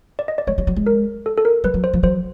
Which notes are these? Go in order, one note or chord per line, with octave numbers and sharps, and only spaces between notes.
D5
D#5
D5
G#3 C#5
G3
F#3
G#3
A#4
A4
A4
A#4
G3 B4
F#3
C5
F3
F#3 C5